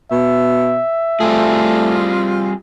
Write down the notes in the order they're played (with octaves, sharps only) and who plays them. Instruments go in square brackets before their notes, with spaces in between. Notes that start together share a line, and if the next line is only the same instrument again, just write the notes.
[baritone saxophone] B2 [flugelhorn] E5
[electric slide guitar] G3 C4 G#4 [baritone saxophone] A3 [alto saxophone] F4